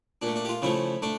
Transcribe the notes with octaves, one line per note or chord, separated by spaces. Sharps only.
A#2 A3 D4
D4
G4
F4
C#3 F3 A3 E4
A3 D4